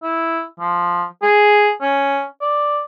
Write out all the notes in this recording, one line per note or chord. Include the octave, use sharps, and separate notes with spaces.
E4
F3
G#4
C#4
D5